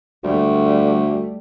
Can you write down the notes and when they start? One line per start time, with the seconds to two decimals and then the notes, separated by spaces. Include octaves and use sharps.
0.24 D2 G3 A3